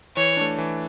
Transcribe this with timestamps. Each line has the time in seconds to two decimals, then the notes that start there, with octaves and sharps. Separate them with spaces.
0.17 E3 C#5
0.37 A3 D4
0.58 E3